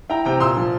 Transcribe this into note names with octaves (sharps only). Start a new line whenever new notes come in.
E4 G5 A#5
C3 G5 A#5
A#2 C6 E6
F3